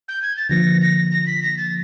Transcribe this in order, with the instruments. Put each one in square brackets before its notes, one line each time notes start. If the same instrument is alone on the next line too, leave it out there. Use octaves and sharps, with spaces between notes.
[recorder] G6
G#6
A6
[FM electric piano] D3 F3 A#3 [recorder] A#6
[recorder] A#6
A#6
B6
A#6
A6